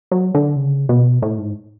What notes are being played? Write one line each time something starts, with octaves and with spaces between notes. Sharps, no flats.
F#3
D3
C#3
B2
A2
G#2